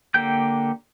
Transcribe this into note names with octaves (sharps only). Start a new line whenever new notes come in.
D3 A#3 G4 G5 G6